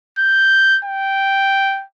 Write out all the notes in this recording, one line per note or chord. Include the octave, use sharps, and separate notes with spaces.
G6
G5